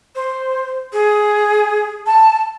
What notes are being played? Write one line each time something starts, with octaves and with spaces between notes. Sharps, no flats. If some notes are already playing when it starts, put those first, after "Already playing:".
C5
G#4
A5